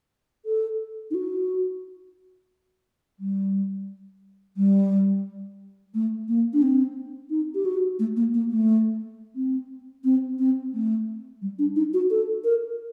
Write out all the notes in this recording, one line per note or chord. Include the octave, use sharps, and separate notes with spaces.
A4
D#4
F#4
G3
G3
A3
A#3
D4
C4
D#4
G4
F#4
A3
A#3
A#3
A3
C4
C4
C4
A3
G3
D4
D#4
F#4
A4
A#4